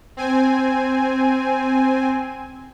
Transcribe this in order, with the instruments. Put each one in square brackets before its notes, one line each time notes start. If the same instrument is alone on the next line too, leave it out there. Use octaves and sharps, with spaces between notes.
[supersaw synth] C4 G#5